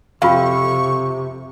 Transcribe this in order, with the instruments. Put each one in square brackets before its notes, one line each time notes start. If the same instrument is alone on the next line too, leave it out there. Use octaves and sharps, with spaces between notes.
[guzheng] F2 [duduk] C3 [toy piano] F4 F5 [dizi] C#6